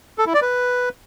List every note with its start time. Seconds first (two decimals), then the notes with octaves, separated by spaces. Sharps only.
0.18 A4
0.26 E4
0.34 D5
0.42 B4